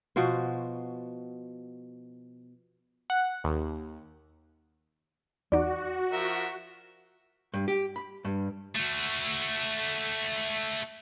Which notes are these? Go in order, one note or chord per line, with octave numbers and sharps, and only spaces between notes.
B2 F3 F#4 C5
F#5
D#2
E2 D#4 F#4 D5
F3 A#4 E5
G2
G4
B5
G2
A3 F#4